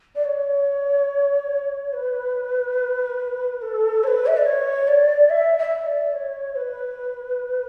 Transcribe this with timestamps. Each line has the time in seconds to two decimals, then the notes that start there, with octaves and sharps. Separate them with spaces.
0.15 D5
0.24 C#5
1.93 B4
3.61 A4
4.03 C#5
4.07 B4
4.26 E5
4.36 D5
4.45 C#5
4.87 D5
5.29 E5
5.58 E5
5.85 D5
6.14 C#5
6.55 B4